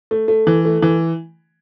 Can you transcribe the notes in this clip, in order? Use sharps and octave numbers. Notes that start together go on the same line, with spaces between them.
A3
A3
E3
A3
E3